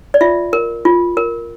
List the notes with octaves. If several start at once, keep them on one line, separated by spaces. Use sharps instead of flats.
D5
F4 E5
A#4
F4
A#4